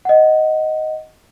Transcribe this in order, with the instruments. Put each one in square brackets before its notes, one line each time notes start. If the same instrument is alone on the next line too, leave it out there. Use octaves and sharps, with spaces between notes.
[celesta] D#5 F#5